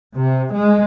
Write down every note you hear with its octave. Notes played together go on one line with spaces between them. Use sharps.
C3
G#3